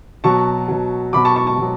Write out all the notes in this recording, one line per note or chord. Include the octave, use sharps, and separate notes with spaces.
B2 F#3 A5 C#6
B2 F#3
B2 F#3 B5 D6
A5 C#6
A5 C#6
A5 C#6
B2 F#3